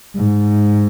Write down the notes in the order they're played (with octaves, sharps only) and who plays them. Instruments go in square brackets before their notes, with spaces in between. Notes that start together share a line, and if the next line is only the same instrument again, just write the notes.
[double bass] G#2